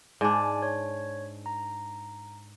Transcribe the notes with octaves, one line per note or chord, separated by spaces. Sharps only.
G#2 D4 D5 G#5 D6
C#5
A#5